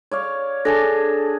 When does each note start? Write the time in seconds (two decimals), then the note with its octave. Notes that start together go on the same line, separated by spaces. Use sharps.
0.11 C#5 D5 F5
0.65 D4 G#4 A4 A5 A#6